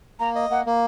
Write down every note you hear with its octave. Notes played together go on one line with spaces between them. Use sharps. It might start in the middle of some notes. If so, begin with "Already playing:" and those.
A#3 A#5
D#5
A#3 F#5
A#3